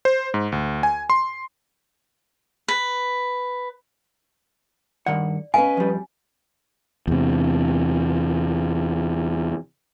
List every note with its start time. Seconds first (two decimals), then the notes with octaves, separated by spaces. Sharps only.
0.05 C5
0.34 G#2
0.52 D2
0.83 G#5
1.10 C6
2.68 B4
5.06 G2 D#3 D5 F#5
5.54 C#4 B4 D#5 F5 G#5
5.77 F2 G3
7.08 E2 C3